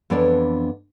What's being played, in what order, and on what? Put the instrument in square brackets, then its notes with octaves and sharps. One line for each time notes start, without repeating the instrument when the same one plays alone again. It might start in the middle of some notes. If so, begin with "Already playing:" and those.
[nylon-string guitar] F2 E3 B3 D4 C#5 D5